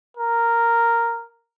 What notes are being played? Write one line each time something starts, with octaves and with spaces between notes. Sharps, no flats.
A#4